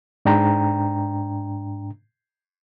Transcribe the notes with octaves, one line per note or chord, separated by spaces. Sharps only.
G#2 D4 G5 A#5